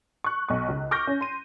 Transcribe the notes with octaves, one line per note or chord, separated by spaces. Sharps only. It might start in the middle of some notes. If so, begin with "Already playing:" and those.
C#6 F#6
B1 C#6
C#2
C#6 D6 F6 G6 A#6
C#4
C6 D#7